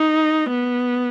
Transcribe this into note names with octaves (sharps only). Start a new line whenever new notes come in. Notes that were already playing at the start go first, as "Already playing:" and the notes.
Already playing: D#4
B3